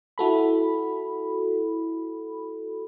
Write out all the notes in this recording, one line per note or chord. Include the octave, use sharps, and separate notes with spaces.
E4 F#4 A4 B5